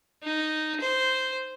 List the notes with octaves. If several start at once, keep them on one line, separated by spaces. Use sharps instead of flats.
D#4
C5